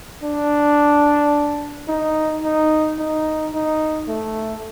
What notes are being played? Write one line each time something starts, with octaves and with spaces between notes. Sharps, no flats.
D4
D#4
D#4
D#4
D#4
A3